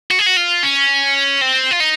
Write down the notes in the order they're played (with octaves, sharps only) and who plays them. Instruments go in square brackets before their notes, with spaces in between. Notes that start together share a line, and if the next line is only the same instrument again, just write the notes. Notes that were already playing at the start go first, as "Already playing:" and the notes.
[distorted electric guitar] F#4
G#4
F#4
F4
C#4
C4
F4
D#4